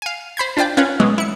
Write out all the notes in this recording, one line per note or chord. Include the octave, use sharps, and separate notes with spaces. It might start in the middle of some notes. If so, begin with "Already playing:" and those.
F5 G#5
C5 B5 G6 G#6
D4 F4 C5 D5 G5 D6
C#4 F4 A#4 B4 C#5
B2 E3 F#3 G#3
E4 C#7